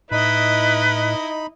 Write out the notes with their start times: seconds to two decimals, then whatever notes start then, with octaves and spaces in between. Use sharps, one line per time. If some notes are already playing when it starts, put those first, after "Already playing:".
0.11 A2 D#4 E4 B4 D#5 B5